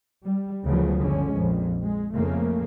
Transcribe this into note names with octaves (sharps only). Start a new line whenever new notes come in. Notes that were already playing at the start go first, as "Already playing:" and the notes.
G3
D2 C#3 F3 F#3 B3
G1 D3 G#3 C#4
A#1 F2
G#3
F2 C#3 A3 A#3